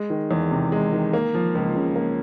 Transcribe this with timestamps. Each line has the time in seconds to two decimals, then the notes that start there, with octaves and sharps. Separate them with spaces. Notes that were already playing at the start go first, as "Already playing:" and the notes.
Already playing: G#3
0.10 D#3
0.31 E2
0.51 C3
0.72 G#3
0.92 D#3
1.13 A#3
1.34 F3
1.55 C#2
1.75 C#3
1.96 A#3